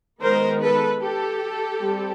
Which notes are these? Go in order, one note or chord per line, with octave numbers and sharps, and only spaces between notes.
D#3 G#3 B3 A#4 C5
A4 B4
G4 A4
G3 C4